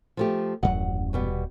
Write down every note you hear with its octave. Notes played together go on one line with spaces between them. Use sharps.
F3 A3 G4
D#1 A1 F#2 F#3 F#5
B2 G3 B3